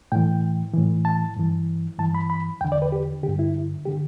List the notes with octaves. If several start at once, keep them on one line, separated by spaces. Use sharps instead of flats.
A2 E3 G5
A2 E3
A5
G2 E3
G2 E3 A5
B5
B5
E2 D3 G5
D5
B4
G4
G2 D3 G4
E4
D3 G4